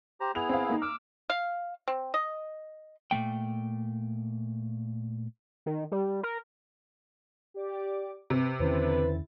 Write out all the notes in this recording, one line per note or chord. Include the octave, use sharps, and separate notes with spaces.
G4 C5 A#5
B3 E4 G#4 F7
C4 F5
A#3 D#4
D6 E6 F6
F5
C4
D#5
A#2 D#3 A3 G5
D#3
G3
A#4
G4 D5 D6
C3 B4
E2 D3 D#3 C#4 E4 B4 C5 A6